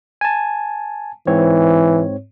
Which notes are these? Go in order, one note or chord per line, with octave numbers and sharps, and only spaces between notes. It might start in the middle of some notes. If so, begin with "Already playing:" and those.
G#5 A5
G#2 E3 C4 C#5